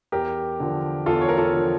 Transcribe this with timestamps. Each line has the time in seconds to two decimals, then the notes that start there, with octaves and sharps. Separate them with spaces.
0.12 E2 G4 A#4
0.60 D3 F3
1.06 E2 F4 A4
1.21 C#5
1.29 A#4
1.37 F4 A4
1.53 D3 F3